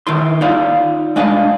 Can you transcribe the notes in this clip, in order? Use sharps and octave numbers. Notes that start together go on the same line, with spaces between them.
D#3 E4 C6
D#4 F4 D5 F5
G#3 D4 D5 D#5 F5